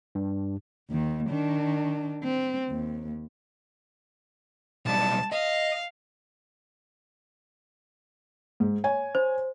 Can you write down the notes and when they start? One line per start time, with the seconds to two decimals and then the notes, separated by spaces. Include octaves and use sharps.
0.15 G2
0.90 D#2 D#3
1.29 D#3 D4
2.23 C4
2.69 D#2
4.86 B1 G3 A5
5.32 D#5 F5
8.60 G#2
8.84 C#5 G#5
9.15 C5